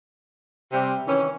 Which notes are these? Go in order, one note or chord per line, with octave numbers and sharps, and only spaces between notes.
C3 G3 C4
D#3 E3 C#4